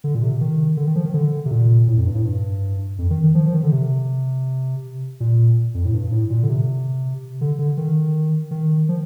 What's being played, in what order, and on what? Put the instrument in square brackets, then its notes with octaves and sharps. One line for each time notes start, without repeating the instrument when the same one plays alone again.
[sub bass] D3
A#2
C3
D#3
D3
D#3
F3
D#3
D3
C3
A#2
A2
F2
G2
A2
G2
F2
D#3
D#3
F3
F3
D#3
D3
C3
A#2
F2
A2
G2
A2
A#2
D3
C3
D3
D3
D#3
D#3
F3